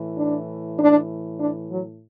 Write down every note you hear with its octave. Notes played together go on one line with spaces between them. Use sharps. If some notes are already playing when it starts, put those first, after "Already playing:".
Already playing: A2 E3
D4
D4
D4
F#3